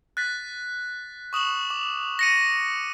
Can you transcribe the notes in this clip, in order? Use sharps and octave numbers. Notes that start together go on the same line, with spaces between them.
F#6 A6 B6
C#6 D#6 E7 F#7
D6
A#6 C#7 D#7